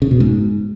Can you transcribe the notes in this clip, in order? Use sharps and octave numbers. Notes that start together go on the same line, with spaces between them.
C#3
B2
G#2